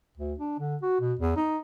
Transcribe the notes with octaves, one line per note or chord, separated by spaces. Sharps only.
D2
D4
D3
F#4
B2
E2
D#4